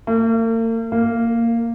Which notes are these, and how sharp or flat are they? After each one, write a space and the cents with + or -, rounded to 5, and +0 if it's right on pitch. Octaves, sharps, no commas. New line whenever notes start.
A#3 -45
A#3 -10